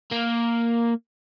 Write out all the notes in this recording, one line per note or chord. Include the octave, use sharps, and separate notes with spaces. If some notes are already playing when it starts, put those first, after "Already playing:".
A#3